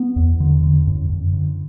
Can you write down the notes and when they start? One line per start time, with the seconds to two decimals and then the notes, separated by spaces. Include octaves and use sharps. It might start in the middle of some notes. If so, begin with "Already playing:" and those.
Already playing: B3
0.16 E2
0.40 D3
0.64 D3
0.87 F#2
1.10 F#2
1.33 D3